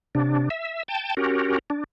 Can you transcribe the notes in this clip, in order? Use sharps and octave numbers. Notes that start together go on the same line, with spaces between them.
C3 D4
E5
G5 A5
C#4 F#4 G4 A#4
D4